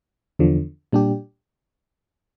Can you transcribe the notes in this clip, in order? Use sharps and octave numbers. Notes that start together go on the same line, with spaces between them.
E2 D3 F3
A#2 G3 D4 G4